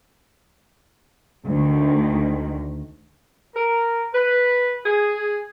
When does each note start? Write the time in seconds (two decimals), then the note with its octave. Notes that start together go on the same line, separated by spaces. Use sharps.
1.44 D2 D#3
3.55 A#4
4.14 B4
4.85 G#4